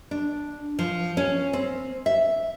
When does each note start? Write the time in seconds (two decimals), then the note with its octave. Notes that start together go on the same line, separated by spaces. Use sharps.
0.11 D4
0.79 F3
1.17 C#4
1.53 C4
2.06 E5